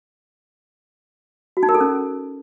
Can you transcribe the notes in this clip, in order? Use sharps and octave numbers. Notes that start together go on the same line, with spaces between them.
F#4
D#4
A#4
A4
C#4